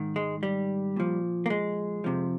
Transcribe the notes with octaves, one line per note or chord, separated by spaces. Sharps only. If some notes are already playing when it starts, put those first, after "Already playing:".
Already playing: G#2 D#3
G#3
G3
A#2 F3
A#3
G#3
F2 C3 F3